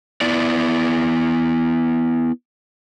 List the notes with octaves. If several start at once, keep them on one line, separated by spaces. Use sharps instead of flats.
B3 E4 D5